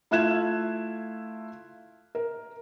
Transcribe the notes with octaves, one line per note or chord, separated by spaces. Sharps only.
A3 E4 F4 F#6 G#6 E7
A#4